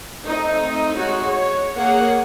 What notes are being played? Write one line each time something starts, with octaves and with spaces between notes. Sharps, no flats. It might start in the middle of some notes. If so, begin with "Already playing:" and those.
A3 C4 D#4
G#3 F#4 C#5
C#5
A#3 G#4 A#4 C#5 F#5